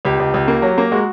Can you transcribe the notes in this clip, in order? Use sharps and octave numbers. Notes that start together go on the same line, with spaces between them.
C#2 G4
C#2
C#2
A#3
F#3
A#3
G#3 F#4